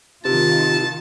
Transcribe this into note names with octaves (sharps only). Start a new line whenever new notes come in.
C3 D#3 D#4 F4 A5